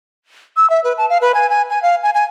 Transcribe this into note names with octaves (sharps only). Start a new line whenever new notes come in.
E6
E5
B4
A5
F5
B4
G#5
G#5
G#5
F5
G#5
G#5